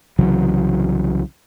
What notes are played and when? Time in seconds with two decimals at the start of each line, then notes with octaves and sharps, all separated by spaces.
0.19 C2 C#3 E3 F#3